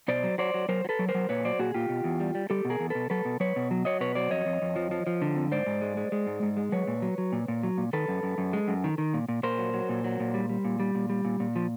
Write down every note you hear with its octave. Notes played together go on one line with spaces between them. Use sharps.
B2 C5 D5
F#3
F#3 C5 D5
F#3
F#3 A#4 C5
F#3
A4 B4
F#3
A#4 C5
F#3
A#2 B4 C#5
F#3 C5 D5
A#2 F#4 G#4
A#2 F4 G4
B2
E2
G3
G3
G3 G4 A4
B2
G#4 A#4
E2
B2 A4 B4
F#3 A4 B4
B2
F#3 B4 C#5
B2
F#3
F#3 C#5 D#5
B2 B4 C#5
F#3 C5 D5
F2 C#5 D#5
F2
F2
F3
F3
F3
D3
F2
G#2 C5 D5
G#2
G#3
G#3
G#3
G#2
G#2
G#3
F#3 B4 C#5
A#2
F#3
F#3
A#2
A#2
F#3
A#2
D#3 A4 B4
F#2
F#2
F#2
G#3
F#2
D#3
D#3
A#2
A#2
A#2 A#4 C5
F#3
F#3
A#2
F#3
A#2
G3
G3
A#2
G3
A#2
G3
A#2
A#2
F3